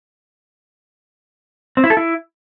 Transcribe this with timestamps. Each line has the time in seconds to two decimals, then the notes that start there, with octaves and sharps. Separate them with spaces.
1.77 C4
1.84 E4
1.90 A4
1.97 E4